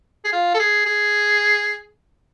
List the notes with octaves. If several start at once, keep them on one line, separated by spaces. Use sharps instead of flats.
G#4
F4
A4
G#4
G#4